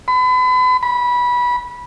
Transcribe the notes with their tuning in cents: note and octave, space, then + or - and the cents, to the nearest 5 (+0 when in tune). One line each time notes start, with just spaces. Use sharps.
B5 +35
B5 -20